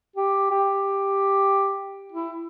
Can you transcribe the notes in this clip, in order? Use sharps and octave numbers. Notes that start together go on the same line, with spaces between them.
G4
G4
E4